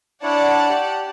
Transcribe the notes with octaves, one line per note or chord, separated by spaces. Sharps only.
D4 E4 C#5 D5 F#5 A5
G4